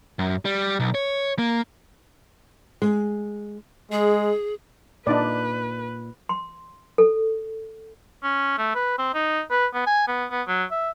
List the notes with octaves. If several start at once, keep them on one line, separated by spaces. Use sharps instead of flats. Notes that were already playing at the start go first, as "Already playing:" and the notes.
F#2
G3
B1
C#5
A#3
G#3
G#3 G#4
A#2 D4 D#4 B4 D5
C6
A4
C#4
A3
B4
C4
D#4
B4
B3
G#5
B3
B3
F#3
E5